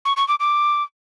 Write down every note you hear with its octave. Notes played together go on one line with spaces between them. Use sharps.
C#6
C#6
D6
D6